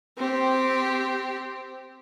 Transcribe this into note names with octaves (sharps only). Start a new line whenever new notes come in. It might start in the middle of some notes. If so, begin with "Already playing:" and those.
C4 G4